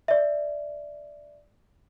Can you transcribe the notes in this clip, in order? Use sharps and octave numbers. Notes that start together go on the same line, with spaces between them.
D5 E5